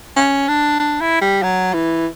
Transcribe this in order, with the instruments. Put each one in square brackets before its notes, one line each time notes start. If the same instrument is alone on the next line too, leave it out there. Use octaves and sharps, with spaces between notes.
[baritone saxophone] C#4
D4
D4
E4
G3
F#3
E3